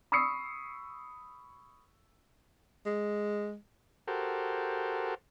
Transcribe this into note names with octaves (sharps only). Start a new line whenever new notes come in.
B5 C#6 D#6 E6 C7 C#7
G#3
F#4 G4 A4 A#4 C5